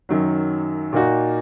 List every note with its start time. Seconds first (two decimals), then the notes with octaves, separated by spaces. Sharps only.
0.09 F#2 D#3 F#3
0.93 A#2 A#3 D#4 F#4